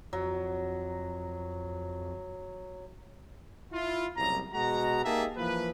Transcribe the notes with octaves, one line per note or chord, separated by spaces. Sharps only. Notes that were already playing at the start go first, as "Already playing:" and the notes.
F2 F#3
E4 F4
F#1 C2 F#3 A#5
B2 G#3 F#4 A#5
A#3 D#4 G4 G#4 E5 A5
E3 F3 A#3 B4